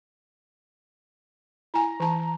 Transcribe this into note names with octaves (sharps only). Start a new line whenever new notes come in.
E4 G#5 A#5
E3 A5